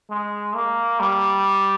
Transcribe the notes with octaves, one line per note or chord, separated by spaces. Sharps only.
G#3
A#3
G3